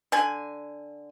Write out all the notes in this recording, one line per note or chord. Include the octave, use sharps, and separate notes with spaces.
D3 G#5